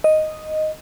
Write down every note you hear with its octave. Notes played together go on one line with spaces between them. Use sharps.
D#5